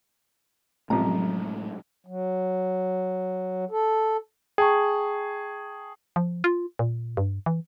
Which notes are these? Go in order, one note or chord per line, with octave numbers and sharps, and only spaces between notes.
A1 A2 C3 F3 F#3 G#3 A3 A#5
F#3
A4
G#4 G5 A5 C#6
F3
F4
A#2
G2
E3